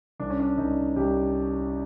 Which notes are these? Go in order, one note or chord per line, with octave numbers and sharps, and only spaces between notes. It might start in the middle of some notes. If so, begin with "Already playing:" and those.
C2 D4
C#4
D4
C2 D#4
C2 G4